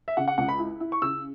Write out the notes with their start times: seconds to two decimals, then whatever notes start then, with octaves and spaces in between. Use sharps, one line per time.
0.08 E5
0.17 C#3 F#5
0.28 F#5
0.38 C#2 F#5
0.49 B5
0.59 E4
0.80 E4
0.92 C#6
1.02 C#3 E6